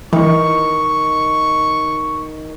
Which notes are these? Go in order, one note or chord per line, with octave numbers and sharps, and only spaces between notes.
D#3 E3 C#6